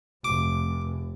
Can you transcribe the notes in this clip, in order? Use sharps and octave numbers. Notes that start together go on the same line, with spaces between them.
F1 D6